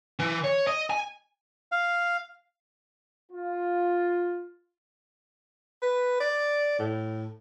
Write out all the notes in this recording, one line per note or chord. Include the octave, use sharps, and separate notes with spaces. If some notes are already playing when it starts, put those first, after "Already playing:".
E3
C#5
D#5
G#5
F5
F4
B4
D5
A2